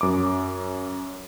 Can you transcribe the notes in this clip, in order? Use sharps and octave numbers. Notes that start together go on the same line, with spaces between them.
F#2 D6